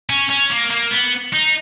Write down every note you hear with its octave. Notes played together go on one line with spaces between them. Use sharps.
C#4
C#4
A#3
A#3
B3
D#4